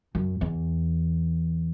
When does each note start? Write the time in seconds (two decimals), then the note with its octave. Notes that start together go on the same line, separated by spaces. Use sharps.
0.15 F#2
0.41 E2